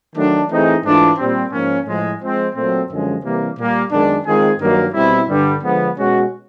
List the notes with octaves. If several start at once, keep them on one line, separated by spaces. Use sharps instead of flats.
D#3 F#3 A3 D4
E3 A3 C4 D#4 G#4
G#2 E3 A3 D4 F4
A#2 G3 C4
G#2 F3 A#3 C#4
A2 F3 G#3
F3 G#3 C4
A#2 F#3 A3 C4
F#2 D3 F3 G#3 C#4
C3 E3 G3 A#3
A#2 G3 A#3
F#2 D#3 G#3 B3 D4
D#3 G#3 C4 F4 G#4
G2 D#3 F#3 A#3 D#4
B2 G3 C4 E4
G2 D3 G3
D3 F3 G#3 B3
B2 G#3 C#4 F#4